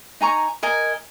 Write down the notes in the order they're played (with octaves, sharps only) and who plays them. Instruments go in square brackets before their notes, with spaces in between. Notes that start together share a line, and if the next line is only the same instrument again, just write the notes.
[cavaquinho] D#4 G#5 A#5 C#6
A#4 D#5 G#5